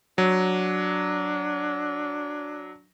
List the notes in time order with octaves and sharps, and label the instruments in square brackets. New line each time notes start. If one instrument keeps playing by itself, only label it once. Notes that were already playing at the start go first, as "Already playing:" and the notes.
[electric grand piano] F#3 [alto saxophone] D4